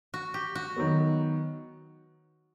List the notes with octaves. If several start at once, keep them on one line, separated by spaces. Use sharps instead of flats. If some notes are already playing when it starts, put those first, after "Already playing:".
F#4
G4
F#4
D#3 F#3 B3